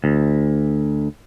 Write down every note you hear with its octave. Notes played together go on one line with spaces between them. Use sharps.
D2